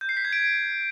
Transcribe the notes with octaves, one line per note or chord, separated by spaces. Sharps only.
G6
C7
B6
G#6
D7